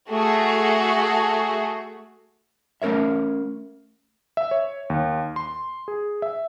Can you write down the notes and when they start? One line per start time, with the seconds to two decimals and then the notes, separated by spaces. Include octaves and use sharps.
0.10 A3 F#4 G#4
2.82 A3 C#4 A#4 C#5 E5
4.37 E5
4.51 C#5
4.90 D#2
5.36 C6
5.88 G#4
6.22 E5